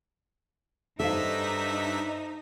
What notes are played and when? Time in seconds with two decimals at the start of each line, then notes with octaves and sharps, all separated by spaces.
1.00 G2 D4 D#4 A4 C5 E5 F5 B6